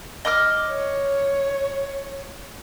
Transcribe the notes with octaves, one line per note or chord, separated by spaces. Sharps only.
D#5 D6 F6
C#5